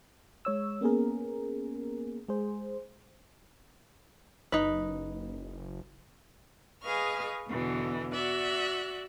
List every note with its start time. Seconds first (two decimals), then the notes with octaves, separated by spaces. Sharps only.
0.45 G#3 C#5 E6
0.81 A#3 B3 C#4 G#4 A#4
2.28 G#3 G#4 C5
4.52 F#1 D#4 B4
6.83 G#4 B4 D#5 F5 C#6 F6
7.47 E2 B2 D3 E3
8.13 F#4 D5 E5 F#6